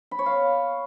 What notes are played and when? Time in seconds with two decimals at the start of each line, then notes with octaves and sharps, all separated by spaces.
0.11 B5
0.19 C#5
0.26 F5